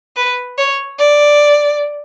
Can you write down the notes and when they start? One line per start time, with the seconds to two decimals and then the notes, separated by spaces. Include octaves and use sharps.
0.16 B4
0.58 C#5
0.98 D5